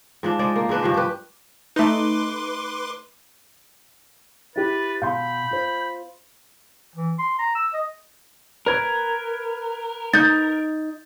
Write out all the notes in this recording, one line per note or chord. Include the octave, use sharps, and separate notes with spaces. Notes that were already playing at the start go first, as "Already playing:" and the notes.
G#2 F3 D4
G#3 C5 D5
A#3
G#2 G#3 D4 B4
G2 F3 C5
G4 B4
A3 D#4 B4 C6 D6
E4 G4 B4 A6
B2 F5 B5 C6 G6
F4 C5
E3
C6
A#5
E6
D#5
A#4 B4 G#6
D#4 G6 A6